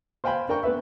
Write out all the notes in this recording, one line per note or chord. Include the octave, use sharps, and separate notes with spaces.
C5 F5 G5 G#5 B5 C6
D4 A#4 G5 C#6
B3 B4 E5